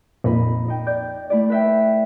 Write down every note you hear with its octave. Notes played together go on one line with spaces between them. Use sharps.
F2 A#2 D#4 B5
D#4 G5
D5 G6
A3 E4 D5
B4 E5 G5